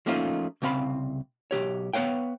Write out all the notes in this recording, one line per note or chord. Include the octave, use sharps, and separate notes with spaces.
F3 A3 A#3 C#4 D#4 F4
C2 C#3 C4 F5 B5
B1 B2 G4 C#5
B3 B4 C#5 F5 G5